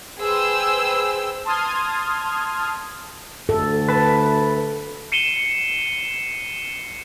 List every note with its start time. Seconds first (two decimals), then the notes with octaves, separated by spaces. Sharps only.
0.20 G#4 B4 C5 G5 E6
1.45 A5 C6 D#6 F6 G#6
3.49 D2 A4
3.89 B4 A5
5.12 C7 C#7 D#7 E7 G7